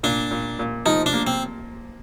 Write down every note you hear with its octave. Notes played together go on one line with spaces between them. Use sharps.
A#2 D4
A#2
A#2
F3 D#4
D4
A#3
C4